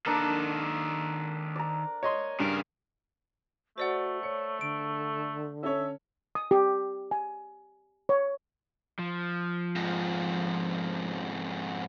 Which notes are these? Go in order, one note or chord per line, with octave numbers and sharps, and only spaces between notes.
D#3 A#3 D4 A4
D5 A#5
C#5 D#5 C6
G2 C#3 A#4
A3 F#4 C5 D5 F#5
C#5 C#7
D3 D7
C#4 A4 C#5 E5
D#6
G4
G#5
C#5
F3
F2 G#2